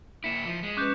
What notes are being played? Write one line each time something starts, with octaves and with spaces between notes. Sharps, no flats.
A#3 E4 B6 C#7 E7
F3
G#3
C#4 B4 D6 F#6 G6